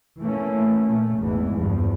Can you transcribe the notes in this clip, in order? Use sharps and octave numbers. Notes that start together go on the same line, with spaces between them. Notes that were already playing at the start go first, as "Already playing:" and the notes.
E3 A3 A#3 C#4
A#2 A3
G#1 E2 G#2 E3
E2 G2 F3